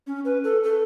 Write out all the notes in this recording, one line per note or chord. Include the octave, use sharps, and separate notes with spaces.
C#4
B4
A4
A4